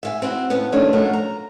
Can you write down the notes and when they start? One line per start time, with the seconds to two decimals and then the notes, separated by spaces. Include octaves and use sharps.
0.03 E5 F5 G#5
0.22 C4 E4 F#4
0.50 F2 A2 B3 C#4
0.72 D#3 F3 G3 A3 C#4 D4
0.93 F#2 F3 G#3 A3 F#4 A#4
1.13 A#5